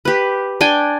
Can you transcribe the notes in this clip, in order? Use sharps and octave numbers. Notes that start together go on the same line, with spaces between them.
G4 B4
D4 G5 G#5